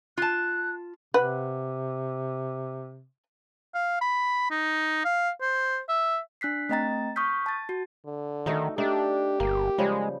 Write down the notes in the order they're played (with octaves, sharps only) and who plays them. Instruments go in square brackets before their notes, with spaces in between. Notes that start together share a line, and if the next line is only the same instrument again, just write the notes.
[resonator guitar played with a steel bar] F4 A5 [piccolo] F#6
[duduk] C3 [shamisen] B4 F#5
[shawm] F5
B5
D#4
F5
C5
E5
[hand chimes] D4 F#6 B6 C7
A3 C4 D#5 G5 A#5 A6
C#6 D#6 F6 G6 B6
A5 A6
F#4
[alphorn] D3
[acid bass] D#3 [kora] A3 D#4 F#4
[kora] A3 D#4 [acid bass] D4 [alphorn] G4
[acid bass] G1 [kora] A#3
[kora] C#3 F3 G3 [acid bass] G#3